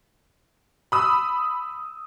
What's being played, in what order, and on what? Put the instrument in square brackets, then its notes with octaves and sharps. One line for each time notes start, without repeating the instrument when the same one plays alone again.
[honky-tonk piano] B5 D#6 E6